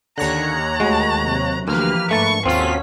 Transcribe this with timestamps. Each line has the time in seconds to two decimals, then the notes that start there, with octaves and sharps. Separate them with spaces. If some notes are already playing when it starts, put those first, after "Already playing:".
0.18 D#2 D3 C#5 A#5 F#6
0.80 D2 G#3 F#4
1.23 C3 F#3
1.68 D2 E3 F3 A#3 G4 B4 F6
2.11 G#2 A3 D4 A5 C#6
2.46 D#2 C4 C#4 F4 F#4 A4 B6